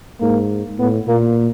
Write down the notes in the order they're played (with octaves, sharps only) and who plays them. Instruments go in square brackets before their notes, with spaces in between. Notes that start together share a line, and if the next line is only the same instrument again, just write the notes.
[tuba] G#2 [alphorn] A#3
[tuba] A2 [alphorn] B3
[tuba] A#2 [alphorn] A#3